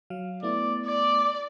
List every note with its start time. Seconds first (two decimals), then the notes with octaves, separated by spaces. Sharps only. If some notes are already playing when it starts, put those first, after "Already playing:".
0.10 F#3 F5
0.43 A3 B3 E4 D5
0.87 D5 D6